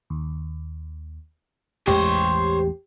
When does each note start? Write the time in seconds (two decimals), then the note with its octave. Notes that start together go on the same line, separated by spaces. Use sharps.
0.10 D#2
1.87 A1 E2 G#3 G4 C5 C#5